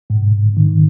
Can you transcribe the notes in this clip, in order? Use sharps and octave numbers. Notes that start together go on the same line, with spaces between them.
G#2
D#3